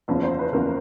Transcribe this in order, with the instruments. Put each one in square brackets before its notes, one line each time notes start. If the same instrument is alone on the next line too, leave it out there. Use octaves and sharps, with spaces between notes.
[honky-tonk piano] F#1 E2 C#3 F3
C5
B4
F#1 E2 C#3 F3 A#4